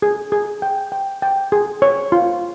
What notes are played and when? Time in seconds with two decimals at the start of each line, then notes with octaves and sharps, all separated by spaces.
0.02 G#4
0.32 G#4
0.62 G5
0.92 G5
1.22 G5
1.52 G#4
1.82 C#5
2.12 F4